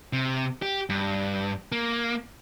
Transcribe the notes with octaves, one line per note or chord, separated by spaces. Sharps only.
C3
G4
G2
A#3